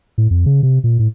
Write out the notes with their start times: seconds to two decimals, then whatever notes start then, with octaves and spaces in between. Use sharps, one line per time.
0.18 A2
0.30 F2
0.46 C#3
0.63 C3
0.84 A#2
0.99 A2